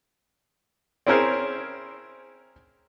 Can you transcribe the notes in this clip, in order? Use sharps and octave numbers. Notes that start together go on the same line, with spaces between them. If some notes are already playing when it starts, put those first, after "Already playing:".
C4 C#4 E4 G#4 A#4 C5